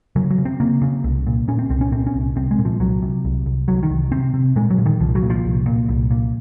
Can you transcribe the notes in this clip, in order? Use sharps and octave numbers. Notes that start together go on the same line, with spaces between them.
C#3 F#3
F#3
C#3
C4
C#3 A#3
C#3
C2
A#2
A#2 C#4
C4
C2 C4
C#4
A#2 C4
C#4
C2
C2 C4
G#3
A#2
F3
C2 F#3
C3
C2
C2
C2 F#3
D#3
C2
C3 C4
C3
A#2 G#3
F#3
A#2
D#3
C2 F3
F#3
A#2
F3
C2
A#2
C2
A#2